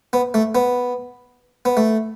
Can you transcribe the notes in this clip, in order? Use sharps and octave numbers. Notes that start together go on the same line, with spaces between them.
B3
A3
B3
B3
A3